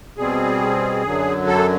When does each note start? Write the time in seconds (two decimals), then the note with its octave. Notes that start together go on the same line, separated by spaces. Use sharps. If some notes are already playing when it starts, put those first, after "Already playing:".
0.17 B2 G3 C4 G#4
1.04 F#2 D3 F#3
1.47 A4